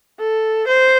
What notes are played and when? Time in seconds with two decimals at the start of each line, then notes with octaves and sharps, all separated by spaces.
0.20 A4
0.68 C5